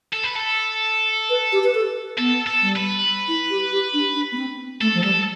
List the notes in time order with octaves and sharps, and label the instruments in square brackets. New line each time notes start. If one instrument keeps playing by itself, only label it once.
[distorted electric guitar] A4
B4
A4
[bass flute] B4
G4
B4
A4
[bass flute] B3 [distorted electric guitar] A4
[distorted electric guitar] A4
[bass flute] G3
[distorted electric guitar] B4
[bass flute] E4
G4
G4
D4
D4
B3
C4
[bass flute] A3 [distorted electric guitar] A4
[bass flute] F3
[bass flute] G3 [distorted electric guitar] A4